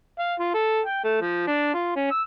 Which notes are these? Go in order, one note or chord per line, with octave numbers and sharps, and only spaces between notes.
F5
F4
A4
G5
A3
F3
D4
F4
C#4
E6